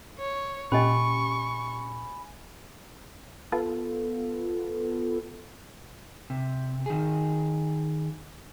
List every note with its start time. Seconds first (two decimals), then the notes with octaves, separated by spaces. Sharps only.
0.18 C#5
0.72 A#2 C#4 G4 D#5 G#5 B5 C#6
3.52 B3 F4 A4
6.30 C3
6.86 D#3 G#4